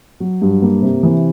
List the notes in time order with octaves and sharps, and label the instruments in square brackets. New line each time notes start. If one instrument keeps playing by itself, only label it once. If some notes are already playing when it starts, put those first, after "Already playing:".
[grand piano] F#3
G2
A#3
C3
E3